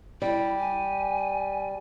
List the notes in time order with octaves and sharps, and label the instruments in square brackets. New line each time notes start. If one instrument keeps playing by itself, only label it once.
[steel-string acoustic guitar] G3 [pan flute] E4
[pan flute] G#5